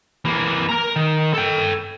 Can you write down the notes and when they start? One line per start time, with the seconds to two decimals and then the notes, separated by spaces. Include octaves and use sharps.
0.25 E3 A#3
0.69 A#4 A#5
0.96 D#3
1.34 A4 G5